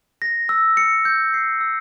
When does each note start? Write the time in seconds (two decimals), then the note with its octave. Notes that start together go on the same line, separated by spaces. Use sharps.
0.22 A#6
0.49 E6
0.77 C#7
1.05 G6
1.34 C7
1.61 E6